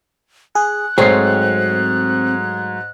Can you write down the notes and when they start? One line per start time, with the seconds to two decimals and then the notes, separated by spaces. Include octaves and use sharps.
0.55 G#4 F#6
0.98 G#2 F#3 A3 C4 G#4 C#5 C7